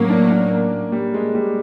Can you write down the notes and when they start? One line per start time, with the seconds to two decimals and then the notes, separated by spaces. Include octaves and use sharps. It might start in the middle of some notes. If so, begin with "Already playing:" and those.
Already playing: A2 F#3 A#3 C#4
0.10 D4
0.30 D4
0.51 A#3
0.92 G3
1.14 G#3
1.35 G3